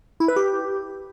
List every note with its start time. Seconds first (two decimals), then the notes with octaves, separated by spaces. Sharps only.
0.20 E4
0.28 B4
0.36 G4